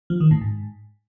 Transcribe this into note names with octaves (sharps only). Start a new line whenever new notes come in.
F3
D#3
A2
G#2